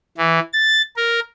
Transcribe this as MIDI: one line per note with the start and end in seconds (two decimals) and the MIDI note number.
0.18 0.40 52
0.53 0.82 93
0.96 1.20 70